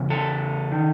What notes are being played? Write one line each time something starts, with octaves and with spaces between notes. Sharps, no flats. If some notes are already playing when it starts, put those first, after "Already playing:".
Already playing: E2 C#3
A4
D#3